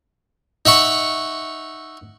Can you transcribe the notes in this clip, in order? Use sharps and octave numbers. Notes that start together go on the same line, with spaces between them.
D#4 E5 F#5 C#6